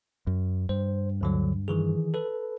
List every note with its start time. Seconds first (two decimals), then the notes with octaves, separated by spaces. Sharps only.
0.27 F#2
0.69 G2 C5
1.21 D2 D3 F#3
1.68 D#3 E3 G#4
2.14 A4 B4